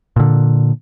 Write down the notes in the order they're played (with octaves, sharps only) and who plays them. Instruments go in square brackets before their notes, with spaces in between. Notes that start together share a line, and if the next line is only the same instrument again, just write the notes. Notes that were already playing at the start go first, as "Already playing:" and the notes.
[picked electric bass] A#2 D3